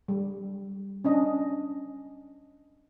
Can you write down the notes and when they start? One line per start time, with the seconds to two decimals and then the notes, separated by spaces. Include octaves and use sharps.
0.08 G3
1.04 C#4 D4 D#5